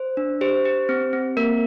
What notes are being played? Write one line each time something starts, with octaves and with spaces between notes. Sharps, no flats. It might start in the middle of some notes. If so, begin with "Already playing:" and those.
Already playing: C5
D4
G4 C5
G4
C4
C4
A#3 A#4